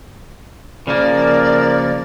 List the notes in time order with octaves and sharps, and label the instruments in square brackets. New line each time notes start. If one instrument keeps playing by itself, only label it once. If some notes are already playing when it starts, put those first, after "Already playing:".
[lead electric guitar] C#3 A#3 [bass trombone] F3 [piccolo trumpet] A#4 [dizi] D5